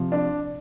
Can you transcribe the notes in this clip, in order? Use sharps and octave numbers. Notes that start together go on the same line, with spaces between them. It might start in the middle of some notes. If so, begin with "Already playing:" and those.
Already playing: C3 F3
D4